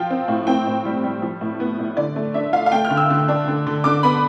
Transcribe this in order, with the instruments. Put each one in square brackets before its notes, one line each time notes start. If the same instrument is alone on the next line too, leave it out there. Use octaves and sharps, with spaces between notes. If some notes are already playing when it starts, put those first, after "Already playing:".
Already playing: [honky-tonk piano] F3 F4 G5
C4
A2
C4 G5
A2
G3
G3
F3
A2
B3
A2
D3 D5
A3
D4 E5
F4 F5
F5
A3 G5
F6
D3
E6
D3
D4
D3
D3
D3 D6
B3 B5